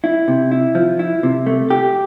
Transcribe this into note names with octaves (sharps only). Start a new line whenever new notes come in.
E4
C3
E4
F3
E4
C3
A3
G4